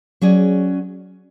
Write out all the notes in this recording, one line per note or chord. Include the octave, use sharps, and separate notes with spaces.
F#3 C#4 G#4 D5